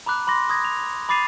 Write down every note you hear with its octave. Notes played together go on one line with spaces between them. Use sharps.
A#5 B5 D6 F#6
B5 C6 D6 A#6
D#6 G#6 A#6
F7
B5 D6 A6 C7 D#7 F7